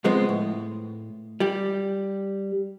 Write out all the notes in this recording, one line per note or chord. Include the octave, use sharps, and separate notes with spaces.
C#2 F3 G#3 B3 C4
A2
G3 G4